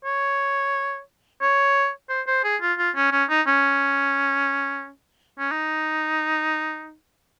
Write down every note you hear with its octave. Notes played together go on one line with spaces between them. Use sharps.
C#5
C#5
C5
C5
G#4
F4
F4
C#4
C#4
D#4
C#4
C#4
D#4